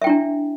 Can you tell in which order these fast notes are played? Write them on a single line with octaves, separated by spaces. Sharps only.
E5 G5 E4 D4